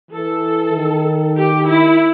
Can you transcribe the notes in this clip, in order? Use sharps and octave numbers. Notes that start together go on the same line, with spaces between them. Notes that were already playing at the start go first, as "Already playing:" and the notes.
E3 A4
D#3
G4
E4